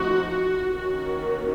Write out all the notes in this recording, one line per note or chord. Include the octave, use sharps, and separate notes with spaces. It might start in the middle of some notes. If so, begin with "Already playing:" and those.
Already playing: F3 A3 C4 D#4 F#4
F#4
D#3 A#3 C#4 F#4